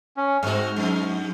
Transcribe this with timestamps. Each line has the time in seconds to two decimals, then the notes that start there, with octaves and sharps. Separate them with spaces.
0.17 C#4
0.43 G#2 G#3 C4 F#4 F6
0.76 F2 G#3